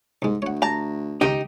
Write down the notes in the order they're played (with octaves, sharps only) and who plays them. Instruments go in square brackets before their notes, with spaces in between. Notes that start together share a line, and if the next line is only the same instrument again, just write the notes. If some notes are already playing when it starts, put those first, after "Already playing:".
[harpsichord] C2 G#3 [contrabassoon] G#2
[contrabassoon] D2 [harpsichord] C#5 F#5
[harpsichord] G4 [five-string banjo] A5 A#5
[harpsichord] C#2 D#3 [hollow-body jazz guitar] D#4 G4